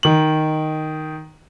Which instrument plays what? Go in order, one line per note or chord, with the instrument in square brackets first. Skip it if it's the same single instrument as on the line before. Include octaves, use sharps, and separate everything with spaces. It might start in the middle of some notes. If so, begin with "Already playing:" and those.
[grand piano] D#3 F#7